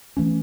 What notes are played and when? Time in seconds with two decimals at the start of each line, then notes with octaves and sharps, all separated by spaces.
0.17 E3 A3 C#4